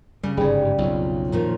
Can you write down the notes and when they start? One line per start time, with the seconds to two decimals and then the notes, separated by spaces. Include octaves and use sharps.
0.23 C#3 G3
0.37 G1 G#2 G3 G#4
0.63 G4
0.78 B1 F2 F#3 F4
1.32 A#2 D#3 F3